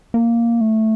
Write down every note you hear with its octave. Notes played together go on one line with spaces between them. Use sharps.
A#3
A3